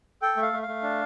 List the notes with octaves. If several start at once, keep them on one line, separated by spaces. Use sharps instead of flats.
A4 G5
A3
F5
A3
F5
A3
D4